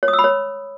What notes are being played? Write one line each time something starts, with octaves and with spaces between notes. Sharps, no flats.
C#5
D#6
E6
B5
C#5